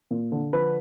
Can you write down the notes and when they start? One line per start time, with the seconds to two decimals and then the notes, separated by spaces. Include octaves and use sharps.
0.11 A#2
0.32 D3
0.53 F3 B4